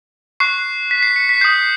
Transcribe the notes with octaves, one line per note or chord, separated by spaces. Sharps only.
C#6 F#6 C7
B6
C7
C#7
B6
D#6 G6 C7